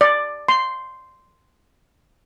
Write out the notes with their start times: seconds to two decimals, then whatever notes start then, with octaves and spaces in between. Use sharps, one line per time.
0.01 D5
0.48 C6